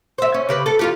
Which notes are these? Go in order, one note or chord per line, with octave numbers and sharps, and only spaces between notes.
C5 E5
C#4
C#3 G4 B4
A4
F2 F4 G4